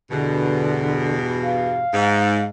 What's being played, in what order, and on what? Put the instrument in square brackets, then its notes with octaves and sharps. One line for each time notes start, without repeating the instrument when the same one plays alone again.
[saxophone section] E2 G2 B2 [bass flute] D3
[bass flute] F5
[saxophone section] G#2